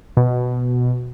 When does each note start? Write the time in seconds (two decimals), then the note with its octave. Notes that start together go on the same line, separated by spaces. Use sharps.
0.17 B2